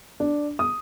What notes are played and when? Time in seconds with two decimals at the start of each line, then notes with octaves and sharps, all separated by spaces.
0.20 D4
0.59 D#6